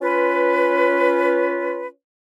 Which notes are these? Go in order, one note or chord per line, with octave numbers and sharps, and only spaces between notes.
C#4 F4 B4